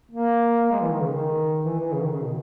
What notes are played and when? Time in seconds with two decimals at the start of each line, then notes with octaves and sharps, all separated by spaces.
0.12 A#3
0.72 G#3
0.82 E3
0.91 D#3
1.02 C#3
1.12 D#3
1.65 E3
1.79 E3
1.92 C#3
2.02 D#3
2.12 C#3
2.22 B2